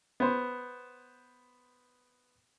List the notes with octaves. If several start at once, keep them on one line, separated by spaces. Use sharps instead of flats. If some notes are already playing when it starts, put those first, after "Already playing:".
B3 C5